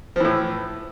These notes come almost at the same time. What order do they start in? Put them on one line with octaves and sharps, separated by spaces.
F3 E3 A2